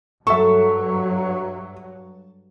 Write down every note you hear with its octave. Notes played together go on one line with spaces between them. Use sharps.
G2 F#3 A4 E5 C#6